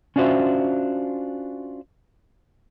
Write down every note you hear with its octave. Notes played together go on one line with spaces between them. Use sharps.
C#4 D4 F4 F#4 C5 E5